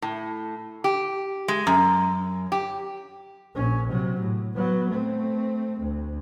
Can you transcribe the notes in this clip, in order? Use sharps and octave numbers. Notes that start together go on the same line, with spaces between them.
A2
G4
G#3
F#2
G4
A#1 C#4
C3 F#3
A2
F#3 B3
A3 C4
D2